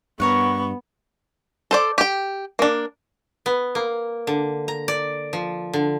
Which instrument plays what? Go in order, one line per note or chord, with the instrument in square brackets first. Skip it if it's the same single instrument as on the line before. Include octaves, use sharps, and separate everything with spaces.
[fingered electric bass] G2 [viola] B3 [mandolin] A#4 C#5 F#5 [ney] C#6
[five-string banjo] A4 C5 D5
G4 G5
A#3 D4
[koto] B3
A#3
D3
A#5
D5
F3
D3